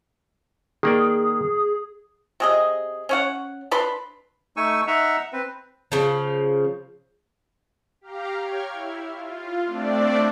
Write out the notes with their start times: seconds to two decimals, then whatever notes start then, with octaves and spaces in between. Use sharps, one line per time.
0.83 D#3 A#3 G#4 D5
2.40 C3 G#4 D#5
3.09 C#4 C#5 F#5
3.71 D4 B4 B5 C6
4.57 A3 D#4 G#5 C#6 E6
4.87 D#4 E5 F#5 A#5
5.33 C4 B4
5.92 C#3 F3
8.01 G4 F5 A#5
8.40 C#5 G5 F6 G#6
8.72 E4
9.10 F4
9.64 A3 C4 D4 D5